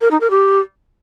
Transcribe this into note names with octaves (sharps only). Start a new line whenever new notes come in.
A#4
D#4
A#4
G4